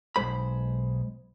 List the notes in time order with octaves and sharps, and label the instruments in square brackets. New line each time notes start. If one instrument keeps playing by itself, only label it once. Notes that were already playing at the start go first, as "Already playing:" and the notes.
[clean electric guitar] B1 A#2 G#3 C5 B5